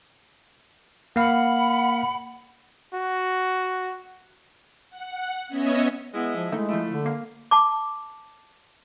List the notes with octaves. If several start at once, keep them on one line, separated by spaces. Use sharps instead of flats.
A#3 F5 F#5 B5
F#4
F#5
B3 C#4 C#5 D#5 E5
G#3 B3 E4
F3
G#3 A3 D#4 E4
F3 A3 E4
D3
A#3 F5
A5 D6